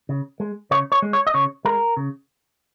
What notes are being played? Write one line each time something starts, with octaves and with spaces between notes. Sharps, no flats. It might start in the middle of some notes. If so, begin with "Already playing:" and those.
C#3
G#3
C#3 C#5
C#5
G#3
C#5
D#5
C#3 C#5
G#3 A#4
C#3